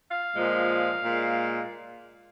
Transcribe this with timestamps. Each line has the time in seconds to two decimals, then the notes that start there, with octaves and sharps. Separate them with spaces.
0.11 F5
0.35 A#2 F3 G#3
1.05 A#2 G#3